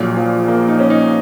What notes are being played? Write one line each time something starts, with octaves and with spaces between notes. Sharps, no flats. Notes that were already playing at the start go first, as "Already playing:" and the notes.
Already playing: A#1 A#2 F#3
F3
A#3
D#4
C#4
D#4